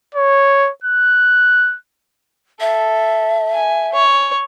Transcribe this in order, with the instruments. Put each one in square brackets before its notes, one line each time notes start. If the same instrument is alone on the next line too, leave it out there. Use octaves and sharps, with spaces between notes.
[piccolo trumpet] C#5
F#6
[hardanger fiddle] A4 [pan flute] E5
[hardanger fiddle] G#5
C#5